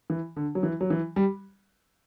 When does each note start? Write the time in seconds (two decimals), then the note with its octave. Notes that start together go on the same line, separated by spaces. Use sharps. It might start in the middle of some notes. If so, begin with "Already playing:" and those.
0.10 E3
0.36 D3
0.55 F#3
0.63 E3
0.81 F#3
0.90 E3
1.16 G3